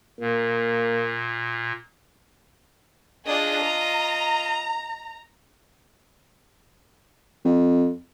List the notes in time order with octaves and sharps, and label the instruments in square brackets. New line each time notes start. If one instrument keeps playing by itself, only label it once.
[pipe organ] A#2 [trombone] A#3
[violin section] D4 G#4 [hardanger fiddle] F4 D#5
[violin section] A#5
[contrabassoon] F2